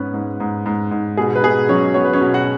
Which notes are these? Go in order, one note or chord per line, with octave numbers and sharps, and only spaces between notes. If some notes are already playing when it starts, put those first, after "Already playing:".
Already playing: G#2 B3 C#4 B4
G#2
G#2
G#2
G#2
B2 G#4
B4
B2 G#4
F#3 C#4 C#5
B3 C#5
B4
C#4 C#5
B2
F#4 F#5